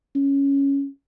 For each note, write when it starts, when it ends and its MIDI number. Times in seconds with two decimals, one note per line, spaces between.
0.15 0.87 61